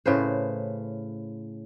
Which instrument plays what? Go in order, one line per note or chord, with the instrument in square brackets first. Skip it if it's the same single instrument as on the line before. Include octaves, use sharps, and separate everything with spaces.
[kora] A2 C#3 B4 C5